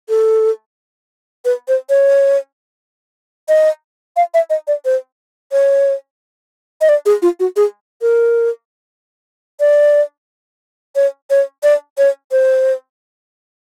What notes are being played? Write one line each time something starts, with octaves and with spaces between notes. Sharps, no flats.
A4
B4
C5
C#5
D#5
F5
E5
D#5
D5
C5
C#5
D#5
D5
G#4
F4
F#4
G#4
A#4
D5
C#5
C#5
D5
C#5
C5